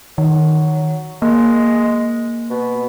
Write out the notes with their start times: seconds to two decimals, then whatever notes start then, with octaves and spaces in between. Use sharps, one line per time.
0.18 D#3 F#3
1.22 G#3 A#3
2.50 B2